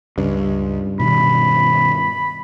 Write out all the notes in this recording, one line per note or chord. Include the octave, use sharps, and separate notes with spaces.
C#2 G2
B2 D#3 B5